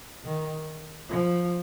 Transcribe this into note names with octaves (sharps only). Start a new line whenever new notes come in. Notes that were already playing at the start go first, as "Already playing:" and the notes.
D#3
F3